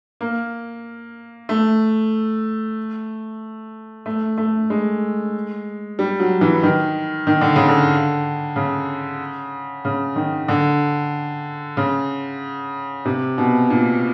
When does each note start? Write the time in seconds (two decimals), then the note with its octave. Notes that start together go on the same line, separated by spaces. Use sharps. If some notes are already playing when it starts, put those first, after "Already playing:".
0.21 A#3
1.49 A3
4.06 A3
4.38 A3
4.70 G#3
5.99 G3
6.20 F#3
6.41 E3
6.63 D#3
7.27 D#3
7.41 D3
7.56 C#3
7.69 D3
8.56 C#3
9.85 C#3
10.16 D#3
10.48 D3
11.77 C#3
13.05 C3
13.38 B2
13.70 A#2